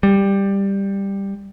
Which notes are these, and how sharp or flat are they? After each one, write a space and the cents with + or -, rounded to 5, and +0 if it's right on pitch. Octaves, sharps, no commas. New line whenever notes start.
G3 +10